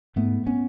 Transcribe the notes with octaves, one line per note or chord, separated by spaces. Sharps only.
G#2 A3 B3
B3 C#4